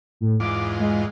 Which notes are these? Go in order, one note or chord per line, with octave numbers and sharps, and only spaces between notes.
A2
E2 G#2 F4 D6
G#3